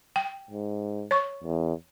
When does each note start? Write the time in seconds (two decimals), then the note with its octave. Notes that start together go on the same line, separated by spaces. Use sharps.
0.16 G5
0.51 G#2
1.11 C#5 C#6
1.44 E2